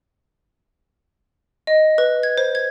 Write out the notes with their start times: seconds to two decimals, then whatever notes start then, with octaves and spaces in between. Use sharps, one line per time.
1.67 D#5
1.98 B4
2.23 G#6
2.38 C5
2.55 G#6